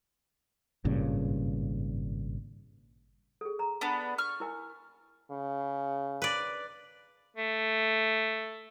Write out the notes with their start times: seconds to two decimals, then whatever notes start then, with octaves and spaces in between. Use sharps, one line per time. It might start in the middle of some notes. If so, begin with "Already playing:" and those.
0.85 G#1 G2 A#2 C#3
3.41 G#4 A4
3.59 A#5
3.81 B3 D4
4.18 C#6 F6
4.40 E4 A#4 G#5
5.31 C#3
6.22 B4 D5
7.37 A3